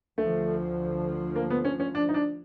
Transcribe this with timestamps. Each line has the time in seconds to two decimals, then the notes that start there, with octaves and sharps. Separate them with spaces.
0.18 D2 D3 F3 A3
1.36 A#3
1.50 B3
1.65 C#4
1.80 C#4
1.95 D4
2.09 D#4
2.14 D4